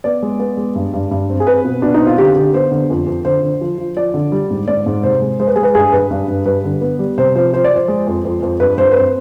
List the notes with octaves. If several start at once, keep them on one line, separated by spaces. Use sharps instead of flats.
B3 D5
G#3
B3
G#3
G2
G2
G2
C4
G#4
C4 B4
B2
B2 D4
D#4
C4
F4
D3 G4
D3 G4
B3 C5
D3
F2
F2
D3 C5
D3
F3
F3
F3 D5
D3
G3
G#2
G#2 D5
G#2
C3 C5
G#3
G#3 C5
B4
G#3 G#4
B4
G2 G#4
G2 B4
G2
G2
G3 B4
D3
B3
G3
C3 C5
F3 C5
F3 C5
D5
F3 C5
G#3
F2
F2
F2
G2 B4
G2 C5
B4
C4 C5